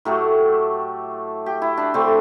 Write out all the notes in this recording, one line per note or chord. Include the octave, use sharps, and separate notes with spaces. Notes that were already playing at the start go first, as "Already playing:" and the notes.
A2 F#3 A3 G4
G4
E4
D4
D3 A3 C4